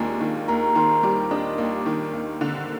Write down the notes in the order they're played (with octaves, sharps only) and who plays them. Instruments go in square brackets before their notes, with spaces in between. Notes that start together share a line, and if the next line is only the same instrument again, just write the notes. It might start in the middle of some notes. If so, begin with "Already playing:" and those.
Already playing: [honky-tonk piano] D#2 D#3 G#3 D4 [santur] D#4 F4 G#4
[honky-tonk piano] D#3
[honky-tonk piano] D#2 [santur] A#4
[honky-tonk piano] D#3 [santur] C5
[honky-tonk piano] G3 [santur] D5
[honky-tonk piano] D4 [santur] D#5
[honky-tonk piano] D#2 [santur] D5
[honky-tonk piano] D#3
D#2
D3